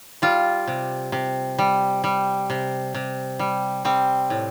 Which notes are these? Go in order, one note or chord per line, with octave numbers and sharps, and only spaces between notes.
G3 F4
C3
C3
G3
G3
C3
C3
G3
G3 C4
A2